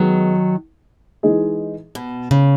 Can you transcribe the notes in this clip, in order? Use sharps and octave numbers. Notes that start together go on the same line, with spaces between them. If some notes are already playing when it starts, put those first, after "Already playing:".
Already playing: D#3 F#3 G#3 B3 D#4
E3 G#3 D#4 G#4
B2
C#3